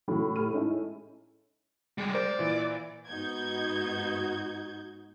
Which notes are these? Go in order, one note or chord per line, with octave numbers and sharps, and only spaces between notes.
A2 C#3 E3 F#3
A2 G4 F6 D#7
G#3 C#4 D#4 E4 A4
G3 G#3
A#4 C5 D5
A#2 E3
G#2 B3 D#4 F#4 G6 G#6